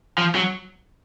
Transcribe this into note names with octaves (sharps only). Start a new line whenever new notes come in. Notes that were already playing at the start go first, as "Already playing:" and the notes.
F3
F#3